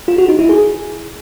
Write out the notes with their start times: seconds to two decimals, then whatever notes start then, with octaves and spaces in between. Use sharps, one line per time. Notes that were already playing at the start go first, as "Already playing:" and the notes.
0.08 F4
0.18 F#4
0.29 D#4
0.39 E4
0.49 G#4